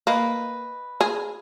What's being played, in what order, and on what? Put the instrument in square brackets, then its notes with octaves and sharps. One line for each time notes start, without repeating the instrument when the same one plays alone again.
[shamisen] A#3 [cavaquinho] B4 D#5
[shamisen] G#4